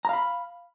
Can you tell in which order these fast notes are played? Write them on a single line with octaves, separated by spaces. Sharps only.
A#5 F5 B5